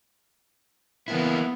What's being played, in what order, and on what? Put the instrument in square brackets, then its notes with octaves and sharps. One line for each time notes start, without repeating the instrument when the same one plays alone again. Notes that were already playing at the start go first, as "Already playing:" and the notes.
[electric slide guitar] E3 A#3 E4 [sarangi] B3